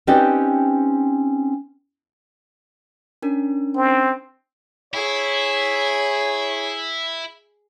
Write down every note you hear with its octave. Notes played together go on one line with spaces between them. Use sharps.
C4 C#4 D#4 G4 B4 D5
C#4 D4 A#4
C4
E4 G#4 C#5